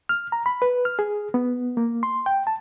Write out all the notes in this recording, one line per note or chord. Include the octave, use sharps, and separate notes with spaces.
F6
A#5
B5
B4
F6
G#4
B3
A#3
C6
G5
A5